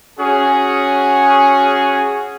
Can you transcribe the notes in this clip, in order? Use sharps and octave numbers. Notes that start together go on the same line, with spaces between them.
C#4 F#4 G#4